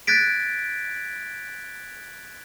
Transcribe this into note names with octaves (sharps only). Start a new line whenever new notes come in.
F#6 G#6 A6 B6 D7